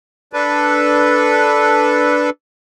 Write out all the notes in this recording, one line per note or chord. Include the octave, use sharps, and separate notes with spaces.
D4 A4 B4